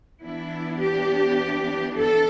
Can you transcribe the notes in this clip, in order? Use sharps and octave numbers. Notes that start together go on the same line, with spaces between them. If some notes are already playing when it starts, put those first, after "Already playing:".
E3 B3 D4 E4
G4
A4